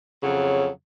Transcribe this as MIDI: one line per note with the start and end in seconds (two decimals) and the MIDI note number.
0.21 0.67 41
0.21 0.67 49
0.21 0.67 54